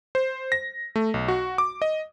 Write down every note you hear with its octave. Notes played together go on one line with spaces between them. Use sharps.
C5
A#6
A3
B1
F#4
D6
D#5